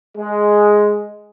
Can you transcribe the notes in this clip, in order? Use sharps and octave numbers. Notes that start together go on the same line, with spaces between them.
G#3